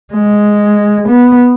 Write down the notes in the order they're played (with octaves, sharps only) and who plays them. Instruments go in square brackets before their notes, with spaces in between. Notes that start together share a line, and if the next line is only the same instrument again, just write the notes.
[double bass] G#3
B3